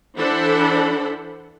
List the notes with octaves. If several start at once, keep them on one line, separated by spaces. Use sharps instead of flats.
E3 D4 A4 C5 F#5 B5